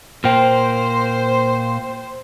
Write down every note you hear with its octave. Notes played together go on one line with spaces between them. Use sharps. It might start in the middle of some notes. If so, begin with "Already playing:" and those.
A#2 A#3 C5 G5 F6